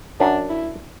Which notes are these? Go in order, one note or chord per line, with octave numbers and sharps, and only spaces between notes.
F#2 D4
E4